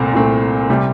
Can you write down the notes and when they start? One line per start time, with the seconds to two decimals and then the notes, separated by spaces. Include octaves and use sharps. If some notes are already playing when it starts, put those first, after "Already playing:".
Already playing: C2 A#2 A3 C4
0.13 C2 A#2 A3 C4
0.70 C3 G3